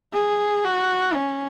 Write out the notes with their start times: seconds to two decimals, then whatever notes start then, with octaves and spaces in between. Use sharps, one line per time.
0.13 G#4
0.65 F#4
1.15 C#4